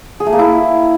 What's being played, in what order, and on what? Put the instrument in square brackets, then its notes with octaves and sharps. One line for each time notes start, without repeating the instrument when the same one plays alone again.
[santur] G#4
A3
A#3
E4